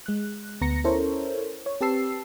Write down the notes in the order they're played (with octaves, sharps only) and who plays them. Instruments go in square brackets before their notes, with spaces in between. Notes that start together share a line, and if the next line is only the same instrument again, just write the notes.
[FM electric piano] G#3 F#6
D2 B3 A#5 A#6 C#7
C#4 E4 A4 A#4 C5 C#5
C#5
C4 G4 B4 A5 E6 C7